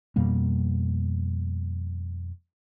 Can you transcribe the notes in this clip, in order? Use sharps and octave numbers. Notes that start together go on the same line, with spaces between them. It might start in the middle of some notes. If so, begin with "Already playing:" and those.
F2 B2 G3 A#3